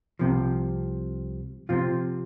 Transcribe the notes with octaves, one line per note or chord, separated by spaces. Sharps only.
C2 C3 F3
C3 F3 C4 F4